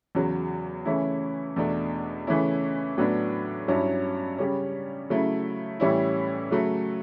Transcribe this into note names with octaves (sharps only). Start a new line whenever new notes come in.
E2 C#3 F#3
C#3 E3 A3 C#4 E4
E2 B2 A3 D4
C#3 E3 A3 C#4 E4
A2 F#3 B3 D4
G2 F#3 C#4 E4
C#3 G3 C#4
C#3 F#3 A3 E4
A2 E3 G3 C#4 E4
C#3 F#3 A3